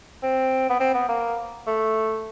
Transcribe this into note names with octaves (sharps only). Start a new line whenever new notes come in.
C4
B3
C4
B3
A#3
A3